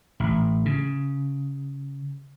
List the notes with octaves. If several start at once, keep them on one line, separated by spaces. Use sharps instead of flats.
A1
C#3